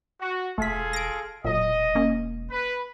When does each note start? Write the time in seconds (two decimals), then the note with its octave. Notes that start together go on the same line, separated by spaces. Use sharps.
0.21 F#4
0.58 E1 A3 F4 G#4 A4 B6
0.93 A#6 D7
1.45 E1 A#2 F#3 D#5
1.95 A#3 C#4
2.51 B4